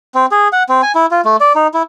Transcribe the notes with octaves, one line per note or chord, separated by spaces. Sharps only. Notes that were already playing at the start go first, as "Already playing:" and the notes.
C4
G#4
F#5
C4
G#5
E4
F4
A3
D5
D#4
E4